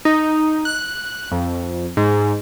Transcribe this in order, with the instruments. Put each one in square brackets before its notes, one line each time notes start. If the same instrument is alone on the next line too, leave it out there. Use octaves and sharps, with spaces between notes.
[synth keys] D#4
F#6
F2
G#2